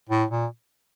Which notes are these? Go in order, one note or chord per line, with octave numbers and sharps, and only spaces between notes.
A2
A#2